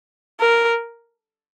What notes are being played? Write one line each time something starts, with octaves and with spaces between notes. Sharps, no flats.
A#4